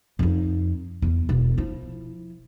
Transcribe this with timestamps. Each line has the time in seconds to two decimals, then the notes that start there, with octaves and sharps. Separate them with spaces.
0.19 F2 D#4
1.02 E2
1.29 E1
1.58 F3 E4